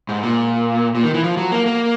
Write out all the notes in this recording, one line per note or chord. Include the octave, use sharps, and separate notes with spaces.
G#2
A#2
A#2
D#3
E3
F3
F#3
A#3
A#3